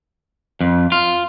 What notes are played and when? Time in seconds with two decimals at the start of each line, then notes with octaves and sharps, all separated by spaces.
0.61 F2
0.92 F4